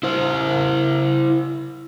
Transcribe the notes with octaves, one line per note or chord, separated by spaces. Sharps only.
E4 C5